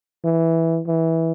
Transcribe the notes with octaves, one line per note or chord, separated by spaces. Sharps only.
E3
E3